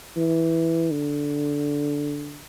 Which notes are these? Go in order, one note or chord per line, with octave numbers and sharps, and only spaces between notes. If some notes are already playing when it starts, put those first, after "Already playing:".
E3
D3